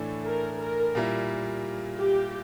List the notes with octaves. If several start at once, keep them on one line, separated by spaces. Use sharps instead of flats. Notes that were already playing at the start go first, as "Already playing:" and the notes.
Already playing: A2 E3 A3 D4
A#4
A#4
A#2 G3 A#3 E4
G4